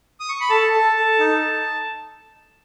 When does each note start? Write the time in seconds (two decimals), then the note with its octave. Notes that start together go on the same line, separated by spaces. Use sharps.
0.20 D#6
0.29 C#6
0.40 B5
0.50 A4 A5
0.72 A4
0.96 A4
1.19 D#4